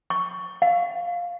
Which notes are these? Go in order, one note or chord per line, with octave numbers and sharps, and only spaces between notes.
C#6
F5